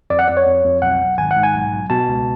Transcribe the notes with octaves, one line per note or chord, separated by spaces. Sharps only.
F2 D5
F#5
F2 D5
C#5
F2
F2
B1 F#5
B1
G#1 G#5
F#5
G#2
G#5
B1
B1
B2 A5
C#2